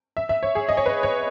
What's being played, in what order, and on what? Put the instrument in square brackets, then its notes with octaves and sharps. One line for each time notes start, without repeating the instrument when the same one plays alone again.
[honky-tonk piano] E5
E5
C#5
G#4
D#5
C#5
B4
C#5